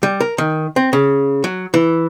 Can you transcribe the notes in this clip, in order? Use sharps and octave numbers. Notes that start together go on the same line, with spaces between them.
G3
A#4
D#3
C4
C#3
F#3
E3